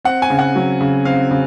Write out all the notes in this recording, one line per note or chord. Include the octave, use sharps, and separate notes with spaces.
C4 F#5
G#5
C#3
F#5
F#3
C#3
C4 F5
C#3